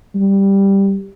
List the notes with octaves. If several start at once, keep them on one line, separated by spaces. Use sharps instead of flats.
G3